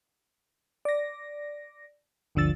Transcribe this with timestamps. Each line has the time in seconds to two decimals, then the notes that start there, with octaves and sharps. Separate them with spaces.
0.85 D5 A#6
2.35 G1 D2 D3 F3 E6 A6